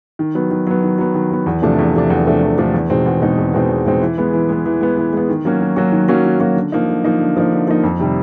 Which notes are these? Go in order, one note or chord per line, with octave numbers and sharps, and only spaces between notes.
D#3
F#3 B3
D#3
F#3 B3
D#3
F#3 B3
D#3
F#3 B3
E2
C3 F3 A3 D4
E2
C3 F3 A3 D4
E2
C3 F3 A3 D4
E2
C3 F3 A3 D4
E2
B2 G#3 C4 D#4
E2
B2 G#3 C4 D#4
E2
B2 G#3 C4 D#4
E2
B2 G#3 C4 D#4
E3
G#3 B3
E3
G#3 B3
E3
G#3 B3
E3
G#3 B3
D#3
F#3 A#3 C#4 F#4
D#3
F#3 A#3 C#4 F#4
D#3
F#3 A#3 C#4 F#4
D#3
F#3 A#3 C#4 F#4
D3
F3 A#3 D#4
D3
F3 A#3 D#4
D3
F3 A#3 D#4
D3
F3 A#3 D#4
F2
C3 D#3 G3